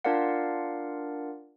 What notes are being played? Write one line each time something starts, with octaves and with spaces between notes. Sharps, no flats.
D4 F4 A#4 D5 F5 F#5